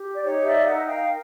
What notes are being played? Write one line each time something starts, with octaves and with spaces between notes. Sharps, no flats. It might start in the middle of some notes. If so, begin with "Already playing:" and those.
Already playing: G4
D5
D#4 C#5
D5 E5
F5
A#4 E5 F#5
F5 G5